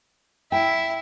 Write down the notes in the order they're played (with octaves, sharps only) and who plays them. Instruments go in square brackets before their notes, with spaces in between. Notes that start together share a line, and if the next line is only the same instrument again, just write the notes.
[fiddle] E4 [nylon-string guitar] G5